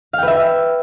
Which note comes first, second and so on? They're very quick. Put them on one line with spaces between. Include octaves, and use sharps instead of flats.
F5 G5 B4 E5